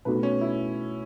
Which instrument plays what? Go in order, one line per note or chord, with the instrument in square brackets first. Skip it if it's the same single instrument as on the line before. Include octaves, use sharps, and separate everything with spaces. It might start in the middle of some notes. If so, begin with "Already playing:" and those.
[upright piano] B2 A3 D#4 F#4 [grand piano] B4
[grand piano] C#4
E4